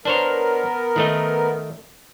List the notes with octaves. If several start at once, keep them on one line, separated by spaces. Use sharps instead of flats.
B3 D4 A#4 C5 C#5
D#3 A3 D#4